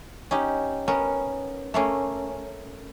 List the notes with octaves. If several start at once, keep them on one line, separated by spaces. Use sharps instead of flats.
C#4 D#4 G4
B3 C#4 A#4
A3 A#3 C#4